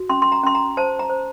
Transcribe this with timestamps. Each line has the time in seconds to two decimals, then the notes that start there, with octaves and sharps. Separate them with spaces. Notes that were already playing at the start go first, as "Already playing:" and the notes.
Already playing: F#4
0.09 C#4 C6
0.22 C6
0.32 A#5
0.43 C#4 C6
0.55 A#5
0.77 C5 A5
0.99 A#5
1.10 C5